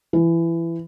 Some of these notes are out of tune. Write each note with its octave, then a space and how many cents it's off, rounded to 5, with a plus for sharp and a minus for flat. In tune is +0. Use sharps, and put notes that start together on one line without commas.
E3 +20